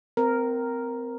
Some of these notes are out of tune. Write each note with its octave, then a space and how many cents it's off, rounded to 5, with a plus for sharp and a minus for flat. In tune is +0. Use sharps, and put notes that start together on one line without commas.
C4 -25 A#4 +0